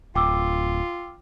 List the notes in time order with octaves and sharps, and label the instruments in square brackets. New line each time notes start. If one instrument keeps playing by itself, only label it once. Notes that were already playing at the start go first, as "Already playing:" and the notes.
[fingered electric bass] D1 [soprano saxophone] F4 [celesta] G5 D6 E6